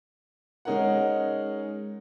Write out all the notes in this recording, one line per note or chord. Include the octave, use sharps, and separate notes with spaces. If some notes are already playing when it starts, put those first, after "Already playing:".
G#3 C#4 D#4 A#4 C#5 F#5